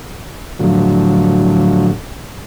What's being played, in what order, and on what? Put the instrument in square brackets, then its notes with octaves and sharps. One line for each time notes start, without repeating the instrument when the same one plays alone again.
[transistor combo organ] A2 D3 F3 F#3